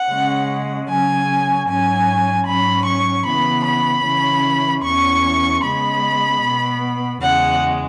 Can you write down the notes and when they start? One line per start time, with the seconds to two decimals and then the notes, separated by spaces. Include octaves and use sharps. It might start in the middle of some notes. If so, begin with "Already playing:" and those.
Already playing: F#5
0.10 C#3 G#3 C#4
0.88 C#3 F#3 C#4 G#5
1.67 G#2 F#3 C#4 G#5
2.47 G#2 F#3 C#4 B5
2.86 C#6
3.25 C#3 E3 B3 B5
3.65 B5
4.05 C#3 E3 C#4
4.84 E2 E3 C#4 C#6
5.63 C#3 G#3 B3 B5
6.42 B2 B3
7.21 E2 C#3 G#3 F#5